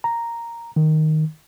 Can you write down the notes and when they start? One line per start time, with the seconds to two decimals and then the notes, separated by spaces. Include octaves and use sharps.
0.04 A#5
0.76 D#3